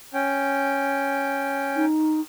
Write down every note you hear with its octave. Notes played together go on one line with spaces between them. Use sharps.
C#4 G5
D#4